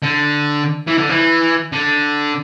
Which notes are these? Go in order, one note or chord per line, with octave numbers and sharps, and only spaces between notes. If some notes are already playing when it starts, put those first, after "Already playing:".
D3
E3
D3
E3
D3